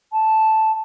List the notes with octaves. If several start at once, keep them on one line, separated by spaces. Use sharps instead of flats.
A5